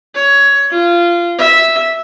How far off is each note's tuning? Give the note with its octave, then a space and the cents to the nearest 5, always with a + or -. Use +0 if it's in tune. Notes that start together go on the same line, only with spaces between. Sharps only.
C#5 +15
F4 -15
E5 -5